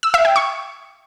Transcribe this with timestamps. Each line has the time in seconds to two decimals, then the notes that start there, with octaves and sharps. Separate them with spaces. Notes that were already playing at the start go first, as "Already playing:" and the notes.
0.03 E6
0.14 E5
0.25 G5
0.36 C#6